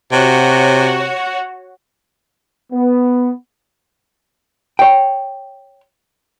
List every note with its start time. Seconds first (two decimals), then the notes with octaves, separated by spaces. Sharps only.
0.12 C3 F#4 C#5 F#5
2.72 B3
4.79 C#5 G5